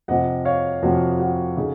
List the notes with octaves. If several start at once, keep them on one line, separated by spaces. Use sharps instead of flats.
F2 C3 F3 D#5 F#5
C#5 F5
F2 C3 F3 F#4
F#4
C#3 A3 D#4